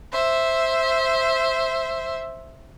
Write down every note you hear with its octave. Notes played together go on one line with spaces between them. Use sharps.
C5 E5